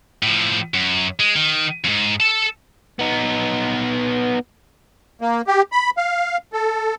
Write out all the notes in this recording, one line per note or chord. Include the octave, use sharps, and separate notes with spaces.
A2 F3
F#2
G#3
D#3
F2 G#2
A4 A5
B3 D#4
A#3
G4
B5
F5
A4